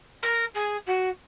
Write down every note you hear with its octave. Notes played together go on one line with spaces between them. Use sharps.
A#4
G#4
F#4